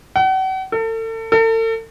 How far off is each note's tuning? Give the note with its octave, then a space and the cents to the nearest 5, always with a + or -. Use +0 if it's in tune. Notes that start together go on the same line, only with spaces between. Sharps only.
F#5 +40
A4 +35
A4 +40